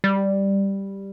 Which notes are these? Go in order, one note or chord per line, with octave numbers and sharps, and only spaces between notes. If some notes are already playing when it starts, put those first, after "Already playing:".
G3